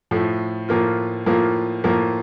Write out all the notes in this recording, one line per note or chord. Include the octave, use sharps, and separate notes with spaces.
A2 F3 A3
A2 F3 A#3 F4
A2 F3 A#3 F4
A2 F3 A#3